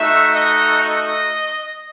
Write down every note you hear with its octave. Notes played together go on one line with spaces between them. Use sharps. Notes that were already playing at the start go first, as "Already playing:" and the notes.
Already playing: A3 D#4 F#4 E5
D#5
D#5